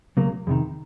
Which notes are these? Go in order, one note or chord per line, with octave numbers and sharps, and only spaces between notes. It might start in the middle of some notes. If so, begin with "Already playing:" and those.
C#2 C#3 F#3 A#3
E2 C3 D#3